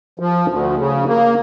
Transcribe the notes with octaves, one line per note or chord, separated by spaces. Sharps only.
F3
D2
C#3
A#3